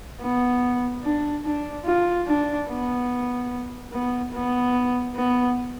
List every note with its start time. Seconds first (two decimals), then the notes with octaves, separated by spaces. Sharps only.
0.21 B3
1.03 D4
1.45 D4
1.85 F4
2.26 D4
2.68 B3
3.92 B3
4.32 B3
5.15 B3